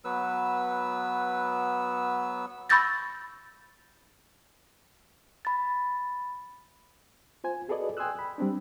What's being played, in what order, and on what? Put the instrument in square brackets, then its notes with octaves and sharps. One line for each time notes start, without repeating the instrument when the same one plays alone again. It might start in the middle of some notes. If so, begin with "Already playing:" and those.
[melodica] F#3 B3 B4 E6
[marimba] B5 C#6 E6 G6 A6 A#6
[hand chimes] B5 A6
[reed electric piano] F4 C5 G#5
F#4 G#4 A4 B4 D5 D#5
G5 G#5 C6 D#6 E6 F#6
B5
G3 C4 D4